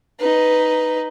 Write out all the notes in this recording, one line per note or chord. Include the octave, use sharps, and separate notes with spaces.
D#4 B4